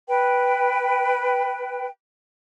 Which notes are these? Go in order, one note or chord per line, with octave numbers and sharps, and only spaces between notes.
B4 G5